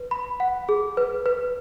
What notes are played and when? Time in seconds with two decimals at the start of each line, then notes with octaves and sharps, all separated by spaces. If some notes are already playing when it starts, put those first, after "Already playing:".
Already playing: B4
0.11 B5
0.40 F#5
0.69 G#4
0.97 B4
1.26 B4